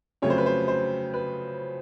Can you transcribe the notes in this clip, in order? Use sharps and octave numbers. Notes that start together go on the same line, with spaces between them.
F2 C#3 F#3 A3 C#5
C5
B4
C5
C5
B4